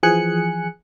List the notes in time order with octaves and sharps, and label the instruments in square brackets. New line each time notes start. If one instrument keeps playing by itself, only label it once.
[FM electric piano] E3 F3 G#4 G#5 F#6 C#7